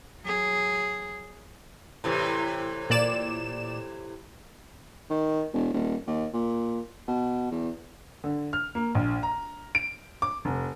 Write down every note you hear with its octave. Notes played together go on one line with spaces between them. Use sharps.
F#3 G#4
A2 C3 E3
A#2 D5 E7
D#3
E1
D#1
D#2
A#2
B2
E2
D3
F6
A#3
A#1
A#5
D7
D6
F1